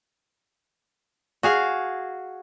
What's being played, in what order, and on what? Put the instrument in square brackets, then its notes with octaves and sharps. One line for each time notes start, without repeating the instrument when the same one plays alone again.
[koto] F#4 G#4 F5